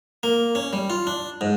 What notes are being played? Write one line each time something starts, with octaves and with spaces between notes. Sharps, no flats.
A#3
C#4
G3
F4
D4
G#2